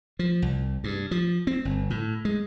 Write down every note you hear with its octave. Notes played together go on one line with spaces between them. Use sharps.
F3
C2
G2
F3
C4
G1
A2
G#3